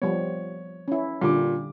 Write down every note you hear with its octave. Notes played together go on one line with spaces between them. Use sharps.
F3 G3 B3 C#5
C#4 E4
A#2 D3 G3 D6